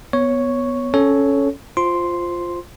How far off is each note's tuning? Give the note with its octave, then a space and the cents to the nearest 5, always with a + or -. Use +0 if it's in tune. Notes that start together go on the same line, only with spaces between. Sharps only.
B3 +0 C#5 +0 C#6 +0
C#4 +0 A4 -10 C#5 +5
F4 +0 C5 +0 C6 +0